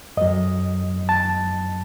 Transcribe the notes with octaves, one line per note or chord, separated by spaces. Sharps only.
F#2 F#3 D#5
A5